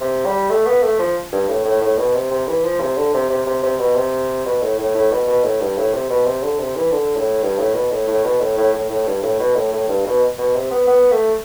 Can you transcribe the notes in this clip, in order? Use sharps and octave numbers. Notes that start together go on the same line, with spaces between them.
C3
G3
A3
B3
A3
F3
G2
A2
A2
A2
B2
C3
C3
E3
F3
C3
D3
C3
C3
C3
C3
B2
C3
B2
A2
A2
A2
B2
B2
A2
G2
A2
C3
B2
C3
D3
C3
E3
D3
A2
G2
A2
B2
A2
A2
B2
A2
A2
A2
A2
G2
A2
B2
A2
A2
G2
B2
B2
C3
B3
B3
A3